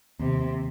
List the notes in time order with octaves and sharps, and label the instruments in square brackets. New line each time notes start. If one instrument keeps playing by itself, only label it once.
[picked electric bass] D#2 [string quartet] C3